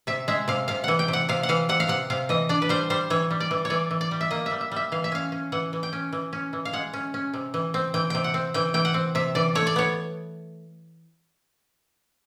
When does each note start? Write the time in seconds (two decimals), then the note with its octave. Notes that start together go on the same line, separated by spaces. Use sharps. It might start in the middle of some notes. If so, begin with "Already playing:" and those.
0.07 C3 E5
0.28 G#3 E5
0.48 C3 F5
0.68 C3 F5
0.84 E3 F#5
0.99 G5
1.08 C3
1.13 F#5
1.29 C3 F5
1.43 F#5
1.49 E3 F5
1.69 C3 F#5
1.80 F5
1.88 C3 F#5
2.10 C3 F5
2.29 E3 D#5
2.49 D4 D5
2.62 B4
2.69 G3 C5
2.90 G3 C5
3.10 E3 C#5
3.31 G3
3.40 D5
3.51 E3
3.65 C#5
3.70 E3 D5
3.91 E3
4.01 D5
4.11 G3
4.21 E5
4.31 A#3 D#5
4.46 G3 E5
4.61 E5
4.72 G3 E5
4.92 E3 F5
5.04 E5
5.12 C#4 F5
5.32 C#4
5.52 E3 F#5
5.73 E3
5.83 G5
5.93 C#4
6.13 E3
6.33 C#4
6.53 E3
6.65 F5
6.73 G#3 F#5
6.93 C#4
7.14 C#4
7.34 C3
7.54 E3
7.74 C4
7.94 E3 G5
8.10 C3 G5
8.24 F#5
8.34 C4
8.54 E3 G5
8.74 E3 G5
8.85 F#5
8.94 C4
9.15 C3 E5
9.35 E3 D5
9.55 A3 C#5
9.67 D5
9.76 B3 C#5